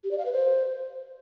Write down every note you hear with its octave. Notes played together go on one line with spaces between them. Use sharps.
G4
D5
F5
B4
C5